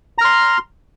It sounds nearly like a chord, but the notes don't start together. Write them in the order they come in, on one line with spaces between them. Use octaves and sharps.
A#5 F6 C6